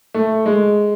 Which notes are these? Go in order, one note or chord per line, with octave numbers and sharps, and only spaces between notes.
A3
G#3